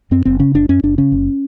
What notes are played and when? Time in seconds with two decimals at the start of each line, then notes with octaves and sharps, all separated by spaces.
0.11 F#2 C4
0.25 F#1 C4
0.39 C#3 C#4
0.54 F#1 D4
0.69 F#2 C#4
0.83 F#1 D4
0.98 C#3 C#4
1.12 F#1